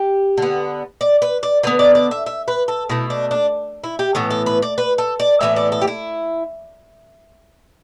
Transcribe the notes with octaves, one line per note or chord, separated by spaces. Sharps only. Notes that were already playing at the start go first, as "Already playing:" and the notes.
Already playing: G4
D3 B3
D5
B4
D5
D3 B3 B4
D5
D5
E5
E5
B4
A4
B2 A3 E4
D4
D4
E4
G4
A2 E3 B3 A4
A4
B4
D5
B4
A4
D5
A2 E3 B3 E5
D5
A4
G4
E4